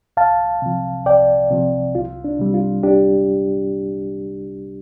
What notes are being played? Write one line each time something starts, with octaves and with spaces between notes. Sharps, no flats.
C2 F5 A5
C3 F3
C2 D5 G5
C3 F3
C2 F4
D4
C3 G3
F4
C2 D4 G4